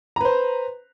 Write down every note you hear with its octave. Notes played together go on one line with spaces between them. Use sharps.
B4 C5 A#5